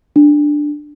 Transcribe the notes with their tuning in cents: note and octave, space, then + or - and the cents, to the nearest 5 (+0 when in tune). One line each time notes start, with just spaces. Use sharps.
D4 +5